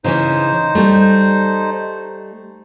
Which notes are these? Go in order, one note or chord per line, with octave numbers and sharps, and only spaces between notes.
C#3 E3 C#4 D#4 C5
G3 A3